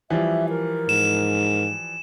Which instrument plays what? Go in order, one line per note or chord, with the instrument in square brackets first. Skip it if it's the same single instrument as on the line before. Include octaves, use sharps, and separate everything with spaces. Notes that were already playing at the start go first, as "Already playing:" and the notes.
[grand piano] E3 F3 G3 [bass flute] E5
[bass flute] A#4
[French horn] G#2 [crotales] E7